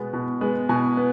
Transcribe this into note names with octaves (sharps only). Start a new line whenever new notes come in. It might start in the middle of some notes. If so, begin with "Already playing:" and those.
Already playing: B2 G#3 B3
B2
G#3 B3
B2 G#5
B3